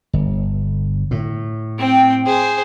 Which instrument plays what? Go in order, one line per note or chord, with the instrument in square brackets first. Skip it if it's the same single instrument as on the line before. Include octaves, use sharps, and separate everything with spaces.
[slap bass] G1
A2
[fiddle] C4 G5
G#4 C5